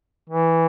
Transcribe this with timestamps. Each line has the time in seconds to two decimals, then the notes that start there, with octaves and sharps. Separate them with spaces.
0.29 E3